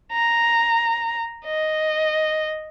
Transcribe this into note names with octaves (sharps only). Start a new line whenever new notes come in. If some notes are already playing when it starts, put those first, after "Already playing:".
A#5
D#5